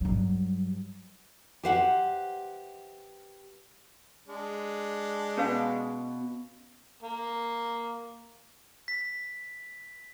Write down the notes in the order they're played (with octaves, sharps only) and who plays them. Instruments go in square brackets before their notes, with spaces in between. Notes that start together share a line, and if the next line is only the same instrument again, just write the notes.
[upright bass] G2 F#3
[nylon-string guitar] G4 B4 C5 E5 F#5
[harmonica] G#3 D4
[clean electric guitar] B2 [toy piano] C#4 B4 F5
[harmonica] A#3
[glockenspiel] B6